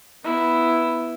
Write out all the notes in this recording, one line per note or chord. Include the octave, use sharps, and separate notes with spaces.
B3 E4